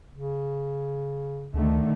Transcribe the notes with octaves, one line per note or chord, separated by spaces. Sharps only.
C#3
D2 D3 D#3 A3